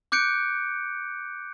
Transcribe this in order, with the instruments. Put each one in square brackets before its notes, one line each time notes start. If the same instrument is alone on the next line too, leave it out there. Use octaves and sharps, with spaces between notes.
[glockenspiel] D6 F#6 G6 C#7 D7